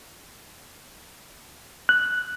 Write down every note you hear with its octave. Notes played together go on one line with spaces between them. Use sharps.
F#6